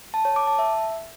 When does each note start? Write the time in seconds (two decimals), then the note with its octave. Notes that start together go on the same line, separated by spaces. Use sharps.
0.14 A5
0.25 C#5
0.36 D6
0.47 A5
0.59 E5